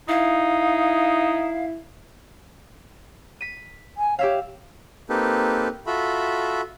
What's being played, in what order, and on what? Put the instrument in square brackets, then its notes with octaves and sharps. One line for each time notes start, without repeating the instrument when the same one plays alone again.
[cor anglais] D#4 [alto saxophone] E4 [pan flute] F5
[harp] B6 D#7
[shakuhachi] G#5
[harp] G4 E5 F5 [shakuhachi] C#5
[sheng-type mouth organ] A#3 C4 D#4 G4 A4 B4
F4 F#4 A4 E5 B5